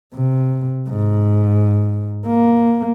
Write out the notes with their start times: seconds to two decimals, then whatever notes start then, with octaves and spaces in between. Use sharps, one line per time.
0.14 C3
0.89 G#2
2.26 A#3